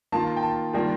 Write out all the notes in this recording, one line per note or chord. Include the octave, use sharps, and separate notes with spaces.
D#3 A#3 F4 A5
G5
A5
D#3 G3 A#3 D4 F4 G5